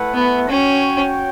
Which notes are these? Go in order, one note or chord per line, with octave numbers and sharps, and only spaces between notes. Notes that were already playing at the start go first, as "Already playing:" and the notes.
Already playing: A3 E4 B4 F#5
B3
C#4 F#4 C#5 G5